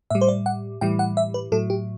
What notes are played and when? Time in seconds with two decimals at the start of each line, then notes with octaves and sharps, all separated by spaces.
0.10 A2 G3 E5
0.21 C5
0.28 D5
0.46 F#5
0.81 A2 E3 G3 G5
0.99 F#5
1.17 E5
1.34 B4
1.52 A2 F#3 A4
1.70 G4